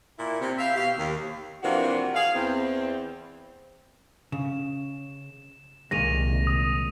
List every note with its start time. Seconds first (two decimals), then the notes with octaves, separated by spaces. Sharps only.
0.19 A#2 E4
0.40 C3
0.58 G4 E5 F5
0.76 B2 G4 F5
0.97 D#2
1.63 C3 E3 F3 A#3 D4 F#4
2.15 G#4 F5
2.35 E2 C4
4.32 C#3 E7
5.91 C2 A#2 D#3 G#3 A#6 D#7 F7
6.47 D#6